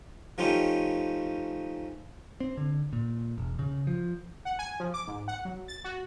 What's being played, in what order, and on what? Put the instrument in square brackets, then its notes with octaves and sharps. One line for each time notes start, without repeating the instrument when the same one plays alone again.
[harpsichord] F3 A3 C#4 D#4 F4 G4
[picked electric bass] C4
D3
A#2
E1
C#3
F3
[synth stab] F#5
G#5
F3
D6
G#2
F#5
F#3
A6
F#4